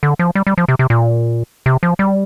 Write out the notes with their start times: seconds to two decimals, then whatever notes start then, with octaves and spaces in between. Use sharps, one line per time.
0.03 D3
0.19 F3
0.35 G3
0.47 G3
0.58 F3
0.68 C3
0.79 C3
0.90 A#2
1.66 C3
1.83 F3
1.99 G3